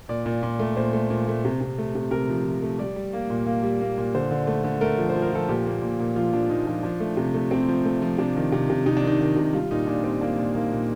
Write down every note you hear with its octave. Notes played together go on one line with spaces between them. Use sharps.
A#2 D5
A#2
A#2
A3
A#2 C5
A3
A#2
A3
C3
C3
A3
C3
C3 A#4
F3
F3
A3
G3 D5
G3
A#3
A#2
A#3
G3
A#3
A#2
D3 C5
D3
A3
D3
A3 A#4
F3
C5
F3
A#4
F3 A4
A#2 G4
A#3
A#2
A#2
F3 F4
F3 D4
A#2 D#4
F3 D4
F3 D4
A3
C3
A3
C3 C4
F3
A3
F3
C3 D4
D#3
C3
C3
C3 D#4
D4
D#3 D#4
D#3
C3
G3 F4
A#2 D#4
A#2 D4
G3 C4
A#3 D4
A#2
A#3 D#4
A#2